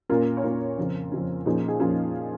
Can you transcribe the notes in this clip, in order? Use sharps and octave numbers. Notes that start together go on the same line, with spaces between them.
A#2 A#3 C#4 F4 A#4
C#5
A#2 A#3 C#4 F4 A#4
F2 C#3 F3 C#4
F2 C#3 F3 C#4
A#2 F3 C#4 D#4 G#4
G#4
A#2 F3 C#4 F4